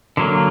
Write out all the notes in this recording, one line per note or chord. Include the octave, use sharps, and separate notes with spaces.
D3 F#3 A#3